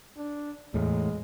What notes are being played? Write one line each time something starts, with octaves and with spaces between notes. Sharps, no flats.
D4
E2 A2 G#3